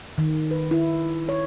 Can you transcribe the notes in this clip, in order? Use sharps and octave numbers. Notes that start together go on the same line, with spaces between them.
D#3
B4
E4
C#5